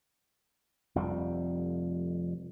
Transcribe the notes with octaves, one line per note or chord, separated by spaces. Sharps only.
F1 F2 G3